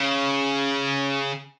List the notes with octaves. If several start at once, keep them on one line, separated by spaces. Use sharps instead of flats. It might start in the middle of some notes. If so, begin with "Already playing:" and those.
Already playing: C#3